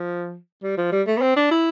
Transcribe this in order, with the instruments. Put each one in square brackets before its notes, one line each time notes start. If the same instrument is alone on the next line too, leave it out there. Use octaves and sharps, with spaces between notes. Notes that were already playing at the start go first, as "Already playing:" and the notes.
Already playing: [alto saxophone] F3
G3
F3
G3
A3
B3
C4
D4
E4